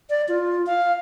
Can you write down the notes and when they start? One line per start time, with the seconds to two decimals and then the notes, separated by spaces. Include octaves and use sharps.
0.10 D5
0.28 F4
0.67 F5